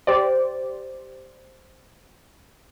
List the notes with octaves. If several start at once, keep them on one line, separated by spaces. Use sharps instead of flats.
G4 C5 D5